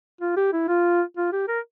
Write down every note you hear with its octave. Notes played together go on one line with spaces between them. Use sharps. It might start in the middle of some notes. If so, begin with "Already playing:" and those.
F4
G4
E4
F4
F4
G4
A#4